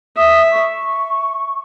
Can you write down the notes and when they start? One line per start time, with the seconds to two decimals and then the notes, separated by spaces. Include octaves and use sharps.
0.17 E5 D#6
0.51 C#6